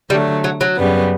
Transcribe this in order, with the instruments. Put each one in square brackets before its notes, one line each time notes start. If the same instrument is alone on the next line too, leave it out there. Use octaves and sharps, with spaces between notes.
[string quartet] D3 F#3 A3 [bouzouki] G3
[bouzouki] F#3
F#3
[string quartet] F#2 C#3 G3 B3